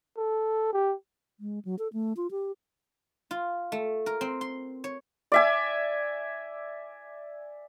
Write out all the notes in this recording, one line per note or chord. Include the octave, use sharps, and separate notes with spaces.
A4
G4
G#3
F#3
A4
A3
F4
G4
F4
A3
A#4
C4
C6
C#5
D5 E5 G#5